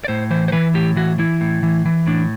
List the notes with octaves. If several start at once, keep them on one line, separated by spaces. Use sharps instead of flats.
D5
A2 C5
E3 C5
C5
E3 B4
A2 G4
E3 F#4
E3 E4
A2
E3
E3
A2 D4